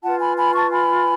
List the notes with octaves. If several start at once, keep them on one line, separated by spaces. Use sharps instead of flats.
F4 B4 F#5 A5
G#5 B5
G#5 B5
A5 C#6
G#5 B5